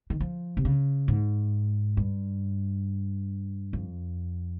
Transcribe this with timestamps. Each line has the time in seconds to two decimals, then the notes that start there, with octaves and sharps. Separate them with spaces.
0.10 D#3
0.20 F3
0.57 C3
0.65 C#3
1.08 G#2
1.97 G2
3.73 F2